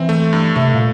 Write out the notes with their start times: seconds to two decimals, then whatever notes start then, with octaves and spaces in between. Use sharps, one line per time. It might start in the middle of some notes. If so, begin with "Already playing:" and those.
Already playing: E3 C4
0.09 A3
0.33 G2
0.56 C3 A3
0.74 A#2